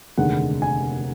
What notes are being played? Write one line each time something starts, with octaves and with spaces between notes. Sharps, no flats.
F1 D#2 D3 G#3 F#5
G#5